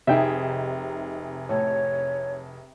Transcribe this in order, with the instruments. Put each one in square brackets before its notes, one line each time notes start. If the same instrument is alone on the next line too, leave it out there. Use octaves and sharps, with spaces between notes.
[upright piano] F1 G#4 [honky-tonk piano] C3 D#4 [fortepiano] E5 G5
[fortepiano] A2 [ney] C#5